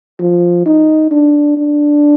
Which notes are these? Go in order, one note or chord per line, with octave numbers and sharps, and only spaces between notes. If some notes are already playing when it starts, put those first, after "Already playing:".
F3
D#4
D4
D4